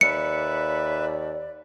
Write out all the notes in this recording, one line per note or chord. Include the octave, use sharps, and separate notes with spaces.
D#2 B4 D5 E5 C#7